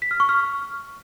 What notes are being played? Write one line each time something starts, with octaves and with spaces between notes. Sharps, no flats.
B6
F6
C#6
F6